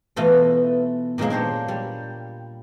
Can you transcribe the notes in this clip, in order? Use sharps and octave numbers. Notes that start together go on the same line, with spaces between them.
B2 E3 A3 F4 A4
A#2 D#3 F#3 G#3 A#3
D4 G4 C5 C#5
G3